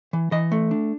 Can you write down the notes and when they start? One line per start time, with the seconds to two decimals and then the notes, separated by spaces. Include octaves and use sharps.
0.13 E3
0.32 E3 D#5
0.52 A3
0.71 D4